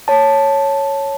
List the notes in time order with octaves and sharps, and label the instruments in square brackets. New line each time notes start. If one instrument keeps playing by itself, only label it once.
[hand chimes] C#5 A5